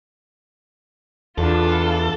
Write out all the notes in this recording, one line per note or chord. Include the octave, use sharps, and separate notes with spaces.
E2 D4 F4 A4